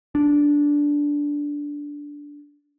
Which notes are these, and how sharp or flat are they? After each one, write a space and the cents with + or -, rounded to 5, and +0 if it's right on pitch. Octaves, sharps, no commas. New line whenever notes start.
D4 -10